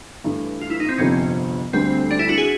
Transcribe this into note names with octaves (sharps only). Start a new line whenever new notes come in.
G2 E3 A3
F4
E4
D#4
C4
G1 F2 C3 F3 C#4
D2 D3 G3 C4
D4
E4
F#4
G#4